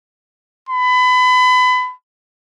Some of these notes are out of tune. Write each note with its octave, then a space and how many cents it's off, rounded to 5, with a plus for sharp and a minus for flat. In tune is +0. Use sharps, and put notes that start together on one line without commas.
B5 +30